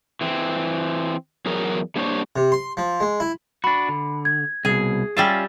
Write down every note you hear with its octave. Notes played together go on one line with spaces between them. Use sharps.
E3 C4
E2 F#3 G#4 A#4
G3 A#3 D4 C5 C#5
C3
C6
F3
G#3
E4
D4 F#4 B5
D3
G#6
C2 B2 G#4
G3 C#4 F4 E5 A5